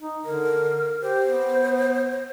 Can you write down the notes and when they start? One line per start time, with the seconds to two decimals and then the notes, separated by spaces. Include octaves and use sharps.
0.01 D#4
0.25 D3 A#4
1.02 G4 C5
1.27 B3